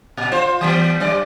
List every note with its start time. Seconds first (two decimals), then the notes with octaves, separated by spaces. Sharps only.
0.17 A#2
0.32 F4 C5
0.61 E3 G3 B3
1.00 F#2 G3 D5